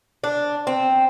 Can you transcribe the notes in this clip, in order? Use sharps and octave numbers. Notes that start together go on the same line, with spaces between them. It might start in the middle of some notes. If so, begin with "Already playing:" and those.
D4
C4